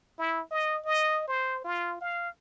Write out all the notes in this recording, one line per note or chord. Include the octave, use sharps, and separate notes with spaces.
E4
D#5
D#5
C5
F4
F5